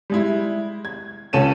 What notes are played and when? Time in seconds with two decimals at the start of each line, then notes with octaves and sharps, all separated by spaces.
0.10 G3 G#3 E4
0.85 G#6
1.33 C#2 C#4 A4 D#7 E7